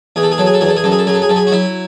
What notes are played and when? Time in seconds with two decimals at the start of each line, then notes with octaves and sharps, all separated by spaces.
0.16 E2 G#4
0.23 A4
0.32 G#4
0.38 F#3 A4
0.46 G#4
0.54 A4
0.61 E2 G#4
0.69 A4
0.77 G#4
0.84 F#2 A4
0.92 G#4
0.99 A4
1.07 F#3 G#4
1.14 A4
1.22 G#4
1.29 F#2 A4
1.36 G#4
1.47 F#4
1.52 F#3 E4